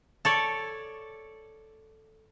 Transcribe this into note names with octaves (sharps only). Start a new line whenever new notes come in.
A4 C#5 D5